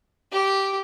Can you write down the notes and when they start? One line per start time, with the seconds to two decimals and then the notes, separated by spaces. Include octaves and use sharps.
0.32 G4